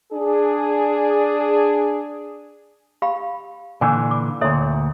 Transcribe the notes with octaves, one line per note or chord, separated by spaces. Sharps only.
D4 G#4
G4 F5 B5
A#2 D3 E3 G#5
D6
D2 A#2 A4 C#5 E5